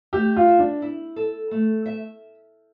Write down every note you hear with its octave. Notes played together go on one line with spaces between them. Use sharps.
A3 G4
F4
E5
D4
E4
A4
A3
E5